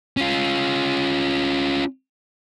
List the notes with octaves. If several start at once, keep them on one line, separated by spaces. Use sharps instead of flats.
C#4 F4